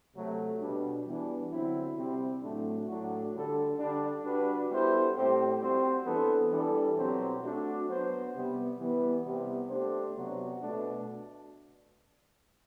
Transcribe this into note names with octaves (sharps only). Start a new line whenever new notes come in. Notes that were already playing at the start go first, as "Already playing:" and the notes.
C3 F#3 A3
B2 G3 D4
E3 G3 B3 D4
D3 F#3 C4 E4
C3 G3 C4
A2 F#3 A3 D4
A2 F#3 A3 D4 F#4
D3 G3 D4 A4
D3 G3 D4
G3 D4 F#4 B4
G3 B3 E4 A4 C5
A2 G3 C4 G4 C5
G3 C4 F#4 C5
E3 B3 D4 A4
E3 G3 D4 A4
B2 F#3 C4 G4 C5
A3 D4 F#4 A4
F#3 B3 F#4 C5
C3 G3 B3
E3 G3 B3
C3 G3 B3
A3 D4 G4 C5
C3 F#3 B3 D4 F#4
B2 A3 D4